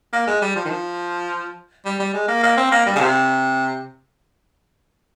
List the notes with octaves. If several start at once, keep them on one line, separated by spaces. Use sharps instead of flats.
A#3
G#3
G3
F3
D#3
F3
G3
G3
G#3
A#3
A#3
C4
A#3
G3
C#3
C3